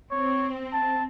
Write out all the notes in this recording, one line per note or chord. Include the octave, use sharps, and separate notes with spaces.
C4 C#5
A5